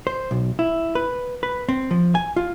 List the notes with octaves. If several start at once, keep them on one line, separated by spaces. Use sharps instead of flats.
C5
B1
E4
B4
B4
C4
F3
G#5
F4